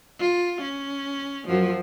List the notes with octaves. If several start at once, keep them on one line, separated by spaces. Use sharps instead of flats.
F4
C#4
F#2 F3